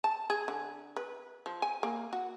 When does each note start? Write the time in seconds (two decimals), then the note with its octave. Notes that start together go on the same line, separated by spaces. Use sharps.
0.04 A5
0.30 G#4
0.48 D3
0.96 B4
1.46 F3
1.62 G#5
1.83 A#3
2.13 F#4